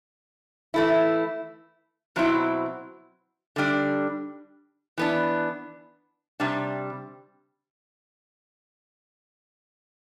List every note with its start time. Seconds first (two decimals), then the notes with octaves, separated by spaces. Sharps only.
0.74 E3 A3 E4
2.16 B2 F#3 C4 E4
3.56 D3 G3 D4
4.98 E3 B3 D4
6.40 C3 G3 D4